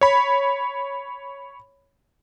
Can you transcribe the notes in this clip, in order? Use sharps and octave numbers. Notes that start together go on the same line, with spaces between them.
C#5 B5